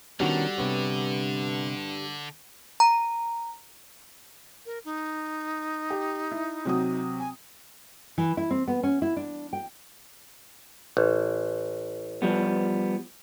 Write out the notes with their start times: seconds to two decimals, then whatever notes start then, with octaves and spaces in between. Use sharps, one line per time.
0.20 B2 D3 D#3 G3 C#4 D4 F#4
0.58 G2 C3 B3 C#5
2.80 A#5
4.66 A#4
4.85 D#4
5.91 G4
6.32 E4
6.65 C3 F#3 D#6
7.19 G#5
8.18 E3
8.37 E4
8.51 C4
8.68 B3
8.83 C#4
9.02 E4
9.17 D4
9.53 G5
10.97 A1
12.22 F3 G3 B3